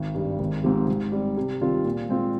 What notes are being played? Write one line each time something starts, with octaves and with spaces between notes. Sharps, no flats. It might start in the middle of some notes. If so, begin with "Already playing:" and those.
Already playing: G#1
G2 G3
G#1
G#2 F3 C4 G4
G#2
G3 C4
C3
D#3 G3 C4 F4
A#2
G#3 C4 F4